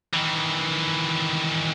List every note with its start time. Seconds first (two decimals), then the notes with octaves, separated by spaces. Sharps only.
0.14 D#3 E3